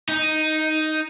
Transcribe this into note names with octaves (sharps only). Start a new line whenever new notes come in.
D#4